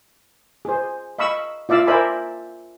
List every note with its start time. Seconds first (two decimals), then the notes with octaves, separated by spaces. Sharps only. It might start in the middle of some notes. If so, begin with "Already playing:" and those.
0.65 G#4 C5
1.19 D#5 F5 B5 C#6 E6
1.69 F4 D5 E5 F5 E6
1.87 A#4 C5 D5 E5 G#5 B5